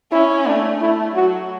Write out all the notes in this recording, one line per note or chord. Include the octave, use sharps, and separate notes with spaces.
C#4 E4
A3 D4
A3 E4
F#3 F#4